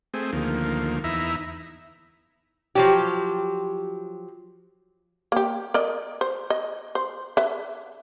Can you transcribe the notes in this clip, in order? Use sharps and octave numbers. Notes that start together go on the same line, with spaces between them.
A3 C4 G#4
D2 D#3 F3 A#3
E2 D#4 E4 E5 A#5
F3 F#3 G4
A#3 G4
A#4 D5 D#5
C5
D#5
C5
B4 E5